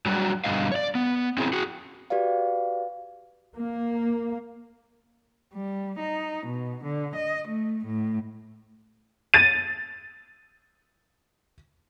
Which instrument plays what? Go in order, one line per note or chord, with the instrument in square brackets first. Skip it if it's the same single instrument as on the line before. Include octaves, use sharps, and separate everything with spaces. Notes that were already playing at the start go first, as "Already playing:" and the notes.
[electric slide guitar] F#3 G3 D4 F4 F#4
G2 B2 D3 G3 D#5 F5
C#5 D5
B3
C4 C#4 E4 G#4
F#4 G#4
[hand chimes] F#4 G4 B4 D5 F5
[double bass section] A#3
[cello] G3
D#4
B2
D3
D#5
A3
A2
[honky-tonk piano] A6 D#7